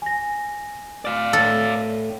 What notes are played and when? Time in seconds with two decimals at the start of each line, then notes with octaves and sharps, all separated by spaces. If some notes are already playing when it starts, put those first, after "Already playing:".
0.02 G#5 A#6
1.05 D5 F5
1.33 A2 A4